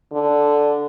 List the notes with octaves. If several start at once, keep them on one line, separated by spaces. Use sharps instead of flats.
D3